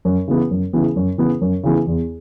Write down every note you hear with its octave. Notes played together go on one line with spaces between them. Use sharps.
F#2
C#3 E3 B3
F#2
C#3 E3 B3
F#2
C#3 E3 B3
F#2
C#3 E3 B3
E2